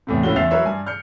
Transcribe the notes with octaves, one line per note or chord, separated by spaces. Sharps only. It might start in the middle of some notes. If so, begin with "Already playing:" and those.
E2 A2 C3
C#2 A2 C#4 E4 F#4 G7
E2 C5 E5 A6 C7 F7
F#3 A#4 B4 C#5 E5
G2 G#5
F6 G6 C#7